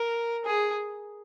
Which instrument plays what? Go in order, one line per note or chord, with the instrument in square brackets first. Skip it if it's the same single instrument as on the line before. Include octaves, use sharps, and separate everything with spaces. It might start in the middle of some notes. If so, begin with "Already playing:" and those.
Already playing: [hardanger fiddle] A#4
G#4